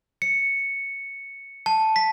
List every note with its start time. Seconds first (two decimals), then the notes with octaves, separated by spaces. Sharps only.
0.22 C#7
1.66 A5
1.96 B6